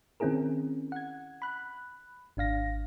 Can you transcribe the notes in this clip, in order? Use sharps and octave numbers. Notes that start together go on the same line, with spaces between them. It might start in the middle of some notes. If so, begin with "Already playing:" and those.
D#3 C4 C#4 E4 G#4 A#4
F#5 G#6
B5 F#6
G#1 D4 F5 A#6